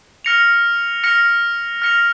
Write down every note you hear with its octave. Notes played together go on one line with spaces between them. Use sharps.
F6 A#6 C#7 F7
F6 A#6 C#7 F7
F6 A#6 C#7 F7